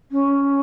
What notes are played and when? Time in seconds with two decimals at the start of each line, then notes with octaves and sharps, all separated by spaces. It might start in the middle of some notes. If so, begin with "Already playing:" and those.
0.12 C#4